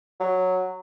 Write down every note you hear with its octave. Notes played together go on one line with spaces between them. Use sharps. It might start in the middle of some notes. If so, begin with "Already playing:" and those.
F#3